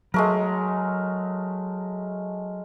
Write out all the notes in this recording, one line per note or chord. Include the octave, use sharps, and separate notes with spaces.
F#3 G#3 A3 A#4